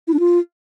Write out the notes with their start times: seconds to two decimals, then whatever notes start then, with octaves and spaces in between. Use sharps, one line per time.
0.08 E4
0.14 D4
0.19 F4